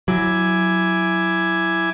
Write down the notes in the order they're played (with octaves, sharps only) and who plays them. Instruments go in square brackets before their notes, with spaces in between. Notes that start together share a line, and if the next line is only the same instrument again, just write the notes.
[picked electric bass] F#3 [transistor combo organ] E4 G#5 D6